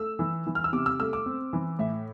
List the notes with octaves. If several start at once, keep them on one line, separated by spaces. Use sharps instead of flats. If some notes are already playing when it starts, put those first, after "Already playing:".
Already playing: A3 E6
E3
E3
F6
E6
C3 D6
E6
A3 E6
D6
C4
E3
A2 E5